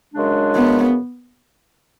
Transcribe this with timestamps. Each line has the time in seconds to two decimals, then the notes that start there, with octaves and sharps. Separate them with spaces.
0.13 F#2 C#3 G#3 D4
0.55 B3